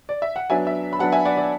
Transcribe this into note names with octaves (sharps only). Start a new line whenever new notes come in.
D5
E5
F#5
F#3 B3 D4 E5 G#5
E5
B5
F#3 B3 D4 F#5 A5
E5 G#5
D5 F#5
D5